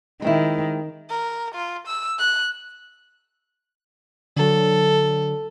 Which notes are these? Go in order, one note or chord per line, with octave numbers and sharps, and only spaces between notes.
D#3 G#3 C4 E4
A#4
F4
E6
F#6
D3 F#3 A4